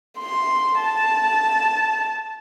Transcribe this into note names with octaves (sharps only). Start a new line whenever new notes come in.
C6
A5